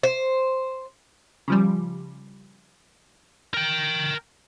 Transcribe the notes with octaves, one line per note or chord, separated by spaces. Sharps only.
C5
C#3 F3 G3
A#4 G5